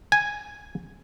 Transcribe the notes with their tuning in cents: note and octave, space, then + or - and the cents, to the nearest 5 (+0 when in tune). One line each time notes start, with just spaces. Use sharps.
G#5 -5